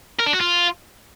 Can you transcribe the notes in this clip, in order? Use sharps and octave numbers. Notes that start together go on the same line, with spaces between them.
A#4
D4
F#4
F4